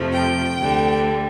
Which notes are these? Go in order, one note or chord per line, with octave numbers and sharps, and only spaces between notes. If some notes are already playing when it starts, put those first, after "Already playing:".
Already playing: F2 C3 F3 A3
G5
D2 D3 G3